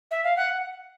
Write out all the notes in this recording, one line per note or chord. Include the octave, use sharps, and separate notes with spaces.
E5
F5
F#5